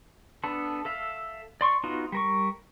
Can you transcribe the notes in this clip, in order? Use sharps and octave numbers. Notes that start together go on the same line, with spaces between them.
B3 D4 A4
A4 E5 F5
D5 C6 C#6
B3 D#4 F4 F#4
G3 A#4 C#6